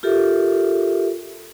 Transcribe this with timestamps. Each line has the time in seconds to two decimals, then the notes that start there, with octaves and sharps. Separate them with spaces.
0.03 F4 G4 A4 A#4 E5